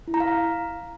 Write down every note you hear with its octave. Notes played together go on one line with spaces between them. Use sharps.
E4
A#5
F5